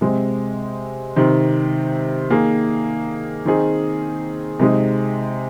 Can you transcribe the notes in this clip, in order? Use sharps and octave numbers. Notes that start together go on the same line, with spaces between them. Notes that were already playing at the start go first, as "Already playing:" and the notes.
C3 G#3 C4
C3 D#3 C4
D#3 A#3 G#4
D#3 C4 D#4 G#4
C3 G#3 D#4 G#4